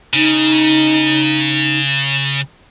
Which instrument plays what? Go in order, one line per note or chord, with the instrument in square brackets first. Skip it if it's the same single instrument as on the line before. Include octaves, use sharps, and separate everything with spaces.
[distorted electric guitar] C#3 [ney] D#4